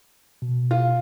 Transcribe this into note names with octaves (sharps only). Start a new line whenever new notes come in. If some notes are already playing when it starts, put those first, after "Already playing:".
B2
F4